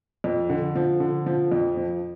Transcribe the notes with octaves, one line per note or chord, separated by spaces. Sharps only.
F2
D3
F3
D3
F3
F2
F3